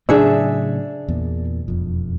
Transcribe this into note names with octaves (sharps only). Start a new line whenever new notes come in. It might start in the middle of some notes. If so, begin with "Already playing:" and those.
A2 C#3 F#3 D4 G#4 E5
E2 A#2
E1 F2